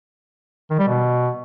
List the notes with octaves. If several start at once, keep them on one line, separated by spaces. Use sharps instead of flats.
D#3
G3
B2